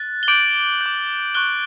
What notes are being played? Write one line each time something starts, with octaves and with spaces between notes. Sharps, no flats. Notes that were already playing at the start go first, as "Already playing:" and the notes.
Already playing: F#6 A6
G7
D6 G6 D7 F#7
D6 G6
C#6 F#6 G7